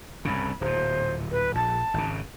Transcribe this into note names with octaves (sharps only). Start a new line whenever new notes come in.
C2 G2 C#3 B5
D1 A#2 C5
B4
A#1 A5
G#1 C#3